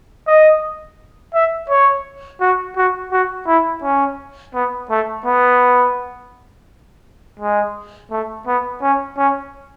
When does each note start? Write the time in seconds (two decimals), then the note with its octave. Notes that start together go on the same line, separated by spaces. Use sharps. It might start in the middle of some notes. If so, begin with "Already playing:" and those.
0.27 D#5
1.34 E5
1.70 C#5
2.41 F#4
2.77 F#4
3.12 F#4
3.47 E4
3.83 C#4
4.54 B3
4.90 A3
5.26 B3
7.40 G#3
8.11 A3
8.47 B3
8.82 C#4
9.18 C#4